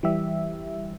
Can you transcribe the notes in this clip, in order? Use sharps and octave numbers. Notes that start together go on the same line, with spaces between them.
E3 G3 G4 E5